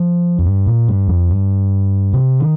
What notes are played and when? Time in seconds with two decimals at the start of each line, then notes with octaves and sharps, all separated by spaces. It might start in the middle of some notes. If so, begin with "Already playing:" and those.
Already playing: F3
0.39 F2
0.46 G2
0.67 A#2
0.88 G2
1.08 F2
1.30 G2
2.13 C3
2.40 D#3